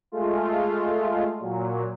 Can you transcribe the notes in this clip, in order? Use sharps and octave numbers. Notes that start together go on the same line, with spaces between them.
G#3 A3 F4
A#2 F#3